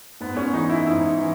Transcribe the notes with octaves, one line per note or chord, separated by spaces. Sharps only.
G#2 B3
C#4
E3 D#4
E4
G#2 E4
E3